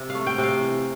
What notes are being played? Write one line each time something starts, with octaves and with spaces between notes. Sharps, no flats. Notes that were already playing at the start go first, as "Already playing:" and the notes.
Already playing: C3
F5
A3
G5
C3
F5
E3